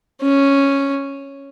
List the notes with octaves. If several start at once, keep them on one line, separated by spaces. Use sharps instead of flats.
C#4